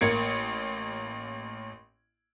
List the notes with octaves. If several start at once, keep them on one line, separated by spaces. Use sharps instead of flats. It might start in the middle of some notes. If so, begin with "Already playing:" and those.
A1 A#3 G#6 C#7